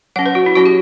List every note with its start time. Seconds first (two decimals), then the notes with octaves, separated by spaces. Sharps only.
0.16 F#3 C#4 F#5
0.26 B4
0.35 F#4
0.46 E4
0.55 F#3 C#4 F#4
0.66 G4